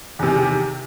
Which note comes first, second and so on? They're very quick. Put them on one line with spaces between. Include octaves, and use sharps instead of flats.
E2 C3 D#3